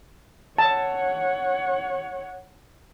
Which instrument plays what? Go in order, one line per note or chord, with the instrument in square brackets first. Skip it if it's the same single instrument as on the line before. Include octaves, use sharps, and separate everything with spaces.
[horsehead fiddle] C#5 F#5 [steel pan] A5